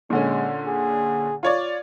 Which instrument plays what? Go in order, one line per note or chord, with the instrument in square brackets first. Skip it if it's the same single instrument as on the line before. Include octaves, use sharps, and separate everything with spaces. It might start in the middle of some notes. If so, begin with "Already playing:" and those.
[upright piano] A#2 D3 C#4 [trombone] G#3
[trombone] G#4
[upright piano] F4 C#5 D5